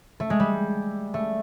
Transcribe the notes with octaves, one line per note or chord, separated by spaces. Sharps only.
A3
G#3
G3
A3